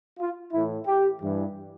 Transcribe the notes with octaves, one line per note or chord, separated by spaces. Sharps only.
F4
A2 E3 E4
G4
G2 E3